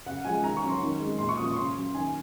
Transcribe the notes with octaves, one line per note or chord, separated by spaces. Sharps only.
C#3 F#5
F3 G#3 G#5
D#3 A#5
C#6
F#3 C#4
C6
D#3
G#3 C4
A#2 C6
C#6
F3 A#3 C#4 D#6
C#6
C#3 C6
F#3 C#4
D#3 G#5